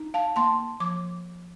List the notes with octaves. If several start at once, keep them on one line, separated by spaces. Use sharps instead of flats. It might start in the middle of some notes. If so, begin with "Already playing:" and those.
Already playing: D#4
F5 A5
A#3 A5 C6
F3 D6